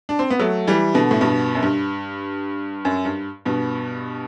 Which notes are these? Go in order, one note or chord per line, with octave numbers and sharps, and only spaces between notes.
D4
C4
B3
F#3 A3
E3 G3
B2 D3
A2
G2 B2
F#2
G2
F#2
G2
G2 B2